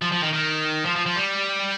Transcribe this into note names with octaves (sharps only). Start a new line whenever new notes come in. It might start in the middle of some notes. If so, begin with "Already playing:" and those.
F3
F3
D#3
D#3
F3
F3
F3
G3